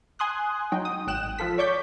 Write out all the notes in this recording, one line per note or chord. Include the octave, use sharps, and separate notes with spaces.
G#5 C6 D#6 F#6
F#3 D#4 G5
D#6
G#1 G5 F#6 E7
F3 F4 A4 B6
C#5 D5 C#6 D6 G6 B6